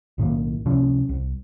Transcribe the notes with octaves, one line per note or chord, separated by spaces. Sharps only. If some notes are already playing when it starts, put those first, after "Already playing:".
B1 A2 D#3 A#3
C#2 C3 F3 C#4
C2